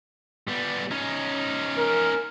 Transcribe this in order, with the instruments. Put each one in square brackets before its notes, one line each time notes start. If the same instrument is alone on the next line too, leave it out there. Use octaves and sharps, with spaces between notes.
[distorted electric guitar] G3 B3
C#4 D#4
[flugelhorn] A#4